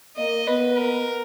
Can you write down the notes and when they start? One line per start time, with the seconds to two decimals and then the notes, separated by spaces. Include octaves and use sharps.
0.17 A#3 D#5
0.47 B3 B4
0.78 A#4